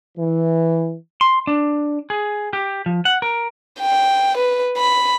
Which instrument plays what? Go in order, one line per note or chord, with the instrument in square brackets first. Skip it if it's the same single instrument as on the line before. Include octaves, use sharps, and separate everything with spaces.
[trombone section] E3
[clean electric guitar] C6
D4
G#4
G4
F3
F#5
A#4
[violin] G5
B4
B5